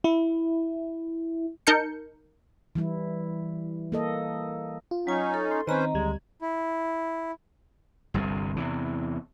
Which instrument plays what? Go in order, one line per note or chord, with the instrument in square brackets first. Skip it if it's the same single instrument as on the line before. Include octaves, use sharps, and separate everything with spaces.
[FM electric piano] E4
[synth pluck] D#4 A#4 A5 G6 C#7
[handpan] E3 G3 E4
A#3 A4 D#5
[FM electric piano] F4
[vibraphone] F#3 G#5 [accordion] C#4 D#4
[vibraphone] A4
[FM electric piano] C6
[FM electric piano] D#3 C4 [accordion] C#4 B4 C5 [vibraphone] D#5 A#5
[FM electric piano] D2 G3 G#6 [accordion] G#3
[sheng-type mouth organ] E4
[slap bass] G1 C2 G2 C3
E2 C3 E3